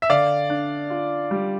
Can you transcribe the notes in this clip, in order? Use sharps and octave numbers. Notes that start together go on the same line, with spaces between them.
E5
D3 D5 F5
D4
F4
G3